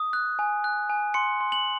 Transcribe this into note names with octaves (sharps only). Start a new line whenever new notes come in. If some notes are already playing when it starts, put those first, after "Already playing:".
Already playing: D#6
F#6
G#5
F#6
G#5
C6 C#7
C6
F#7